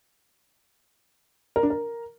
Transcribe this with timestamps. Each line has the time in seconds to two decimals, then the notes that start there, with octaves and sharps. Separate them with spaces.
1.56 A#4
1.63 D4
1.70 A#4